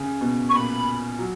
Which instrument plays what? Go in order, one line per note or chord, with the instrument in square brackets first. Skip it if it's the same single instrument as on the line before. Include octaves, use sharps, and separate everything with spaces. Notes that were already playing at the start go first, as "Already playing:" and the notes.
Already playing: [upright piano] C#3
B2
[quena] C#6
[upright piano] A#2 [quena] B5
[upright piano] F#3